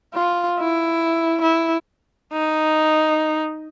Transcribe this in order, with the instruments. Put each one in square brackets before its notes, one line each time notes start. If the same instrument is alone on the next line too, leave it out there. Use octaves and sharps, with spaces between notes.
[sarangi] F4
E4
E4
D#4